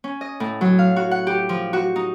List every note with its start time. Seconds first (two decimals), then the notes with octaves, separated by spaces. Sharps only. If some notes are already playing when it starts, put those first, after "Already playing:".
0.04 C#4
0.21 D#5
0.40 A2
0.61 F#3
0.79 F5
0.96 F#4
1.11 F#5
1.27 G4
1.49 F3
1.73 F#4
1.96 D#4